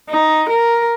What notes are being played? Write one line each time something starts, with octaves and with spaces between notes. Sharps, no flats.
D#4
A#4